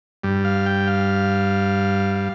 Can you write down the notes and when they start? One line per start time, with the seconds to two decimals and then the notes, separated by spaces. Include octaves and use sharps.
0.24 G2 G3
0.45 F5
0.66 G5
0.87 F5
2.16 F5